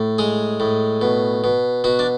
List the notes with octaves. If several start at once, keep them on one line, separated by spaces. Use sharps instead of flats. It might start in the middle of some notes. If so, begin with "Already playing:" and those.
Already playing: A2
G#3 G#4
A2
B2
B2
B2 F#4
D4